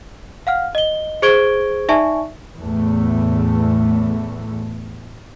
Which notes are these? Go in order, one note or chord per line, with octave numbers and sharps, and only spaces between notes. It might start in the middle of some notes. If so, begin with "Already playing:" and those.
F5 F#5 F6
D#5 G7
G#4 C5 C#6 G#6 D7 G7
D#4 D5 E5 G#5 A5 C#6
E2 A2 A3